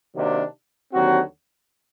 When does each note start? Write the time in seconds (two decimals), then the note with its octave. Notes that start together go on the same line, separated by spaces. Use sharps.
0.14 C3 D#3 F#3 A#3 D4
0.92 D#2 D3 F#3 C4 F#4